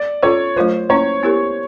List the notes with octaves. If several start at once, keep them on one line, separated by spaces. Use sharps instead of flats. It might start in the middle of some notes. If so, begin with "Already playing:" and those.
Already playing: D5
C#4 F4 A4 C#5
F#3 A3 D4 F4 A#4 C5
A#3 C#4 E4 C#5
B3 E4 G4 A#4